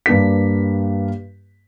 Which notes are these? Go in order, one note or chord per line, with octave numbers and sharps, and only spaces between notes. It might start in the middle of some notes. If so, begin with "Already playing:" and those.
G2 A#3 D4 B4 B6